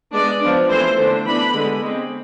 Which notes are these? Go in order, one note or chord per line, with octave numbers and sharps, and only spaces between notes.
G#3 B3 D4 D5
F3 B3 D4
E3 A3 C4 C5
D3 A3 D4
E3 B3 D4 B5
D3 G#3 B3
G#3 C4